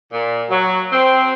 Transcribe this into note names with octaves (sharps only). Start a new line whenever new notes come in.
A#2
F#3
C4